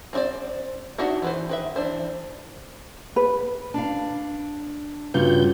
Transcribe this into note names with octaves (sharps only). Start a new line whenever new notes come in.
C4 D#4 E4 C5 D5
D4 D#4 F#4 E5 F#5
E3 B4 C5
D#3 B4 E5
E3 D4 C5
B4
D4 F5
G2 C#3 F4 F#4 G6